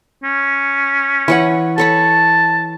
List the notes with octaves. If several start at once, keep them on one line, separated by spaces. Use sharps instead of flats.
C#4
E3 C#5 F#5
A4 C#5 A5 B5